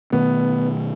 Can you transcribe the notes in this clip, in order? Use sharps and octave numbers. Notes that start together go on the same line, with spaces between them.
B2 D#3 A3 B3